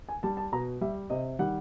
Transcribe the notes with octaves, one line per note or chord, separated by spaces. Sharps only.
G#5
G3 A5
A5
B2 A#5
G3 E5
C3 D#5
D#3 G3 F#5